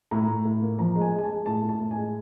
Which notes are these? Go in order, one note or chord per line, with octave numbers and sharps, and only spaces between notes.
A2 A#5
A2
A2
A#3
F3 A#5
G#3
G#5
G#3
G#5
A5
G#3
A2 A5
A2
A5
A2
G#5
G#3